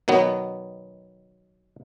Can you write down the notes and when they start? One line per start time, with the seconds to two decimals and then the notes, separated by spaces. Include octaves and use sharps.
0.08 B2 D#3 F#3 B3